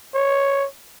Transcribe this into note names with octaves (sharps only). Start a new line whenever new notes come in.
C#5